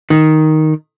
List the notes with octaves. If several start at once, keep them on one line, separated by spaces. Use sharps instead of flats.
D#3